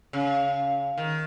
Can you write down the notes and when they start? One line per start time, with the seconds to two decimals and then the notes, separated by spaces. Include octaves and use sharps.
0.13 C#3
0.98 D#3